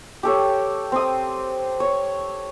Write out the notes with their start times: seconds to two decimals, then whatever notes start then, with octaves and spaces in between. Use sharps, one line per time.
0.23 G4 A4 C#5
0.92 C4 D#6
1.80 C#5